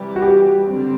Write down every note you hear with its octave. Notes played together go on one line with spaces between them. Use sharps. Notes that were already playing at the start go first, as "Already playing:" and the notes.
Already playing: C3 E3 G3
F#4
G4
D3 G3 C4